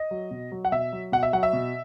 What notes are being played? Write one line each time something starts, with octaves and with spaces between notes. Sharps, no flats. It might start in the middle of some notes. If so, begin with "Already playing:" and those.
Already playing: D#5
F#3
B2
F#3
F#5
B2 E5
F#3
B2 F#5
E5
F#3 F#5
E5
B2